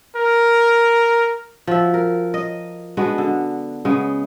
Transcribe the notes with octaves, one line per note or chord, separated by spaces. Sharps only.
A#4
F3 F#4 E5
A#4
D#5
G#3 B3 D4 F#4
D3
C#3 G#3 B3